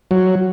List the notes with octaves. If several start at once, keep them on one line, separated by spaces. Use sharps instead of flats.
F#3